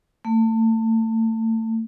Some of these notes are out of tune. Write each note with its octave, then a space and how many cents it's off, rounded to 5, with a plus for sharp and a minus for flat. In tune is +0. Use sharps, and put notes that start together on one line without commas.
A3 +30